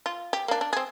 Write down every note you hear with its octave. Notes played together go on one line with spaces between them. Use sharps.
F4
G4
A#3 D4
D4
C4 G#4